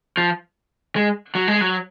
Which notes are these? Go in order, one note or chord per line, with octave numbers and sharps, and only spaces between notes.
F3
G#3
F#3
G#3
F#3